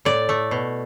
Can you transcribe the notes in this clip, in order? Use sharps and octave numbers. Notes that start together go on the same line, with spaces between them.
A2 D5
A3
B2